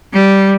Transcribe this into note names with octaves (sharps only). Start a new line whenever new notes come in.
G3